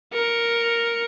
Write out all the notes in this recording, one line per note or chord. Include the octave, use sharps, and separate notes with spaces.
A#4 C#7